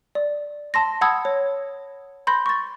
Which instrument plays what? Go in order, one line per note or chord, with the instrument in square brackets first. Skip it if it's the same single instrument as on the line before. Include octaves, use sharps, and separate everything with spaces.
[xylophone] D5
A5 C6 A#6
F#5 A5 B5 D#6 E6 G#6
C#5
B5 C6 G6 A#6
C#6 A6